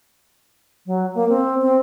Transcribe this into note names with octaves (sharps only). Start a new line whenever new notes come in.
F#3
A#3
C4
C4